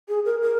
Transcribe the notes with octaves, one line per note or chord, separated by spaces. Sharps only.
G#4
A#4
A#4